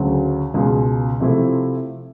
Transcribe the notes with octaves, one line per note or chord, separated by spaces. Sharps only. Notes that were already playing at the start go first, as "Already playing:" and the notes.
Already playing: D2 C#3 F#3
C#2 B2 G#3
C3 F3 A3 C4 E4